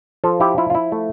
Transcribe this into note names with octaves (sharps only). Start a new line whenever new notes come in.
F3 F4 A4
E4 G4
E4 F4
F4
E4
A3